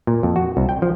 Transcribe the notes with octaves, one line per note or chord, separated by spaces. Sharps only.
A#2
F2
F#4
C2
G5
F3